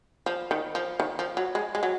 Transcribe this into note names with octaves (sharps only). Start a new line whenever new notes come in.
F3
D#3
F3
D#3
F3
F#3
G#3
G#3
F#3